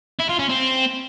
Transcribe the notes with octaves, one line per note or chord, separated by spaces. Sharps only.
E4
F4
C#4
C4